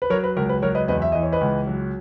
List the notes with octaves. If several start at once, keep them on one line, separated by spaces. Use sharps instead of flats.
B4
F#3 A#4 C#5
B4
C#2 A#4
B4
F#3 A#4 C#5
B4 D#5
E2 B4 D#5
E5
E3 D#5
C#5
B4 D#5
C#2
F#3